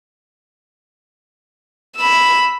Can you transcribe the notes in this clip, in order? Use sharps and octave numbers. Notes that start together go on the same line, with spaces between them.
B5 E6